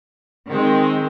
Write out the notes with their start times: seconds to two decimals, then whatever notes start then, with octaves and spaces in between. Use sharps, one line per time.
0.48 D#3 G#3 C4